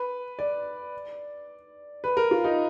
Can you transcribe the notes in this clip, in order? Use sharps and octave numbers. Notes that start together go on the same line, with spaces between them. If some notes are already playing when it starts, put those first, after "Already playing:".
Already playing: B4
D5
B4
A#4
F4
D#4